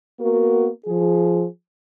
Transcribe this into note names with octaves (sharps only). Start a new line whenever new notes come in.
A#3 B3 F#4 A#4
F3 G#4